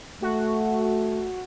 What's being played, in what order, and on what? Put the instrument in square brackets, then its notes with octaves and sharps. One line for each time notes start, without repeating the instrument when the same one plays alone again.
[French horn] A3 [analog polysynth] F#4